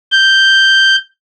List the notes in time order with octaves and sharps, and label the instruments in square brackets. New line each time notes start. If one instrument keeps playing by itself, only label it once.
[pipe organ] G6